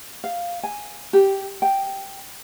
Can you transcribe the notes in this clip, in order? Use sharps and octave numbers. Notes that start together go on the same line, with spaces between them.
F5
G#5
G4
G5